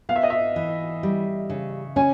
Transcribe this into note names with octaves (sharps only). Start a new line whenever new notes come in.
B3 F5
E5
D#5
E5
E3
G3
C#3
C#4 G#5